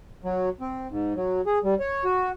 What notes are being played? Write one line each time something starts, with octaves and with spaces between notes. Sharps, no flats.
F#3
C4
G#2
F#3
G#4
G3
C#5
F#4